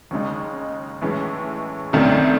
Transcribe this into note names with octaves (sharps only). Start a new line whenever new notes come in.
D#2 C#3 G#3 D#4
A2 E3 G#3 C#4
C2 C3 D#3 A3 C#4